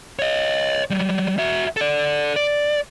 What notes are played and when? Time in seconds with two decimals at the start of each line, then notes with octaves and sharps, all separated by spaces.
0.19 C#5 D#5
0.90 F#3 G3
1.38 F#4 E5
1.77 A4 D5
2.36 D5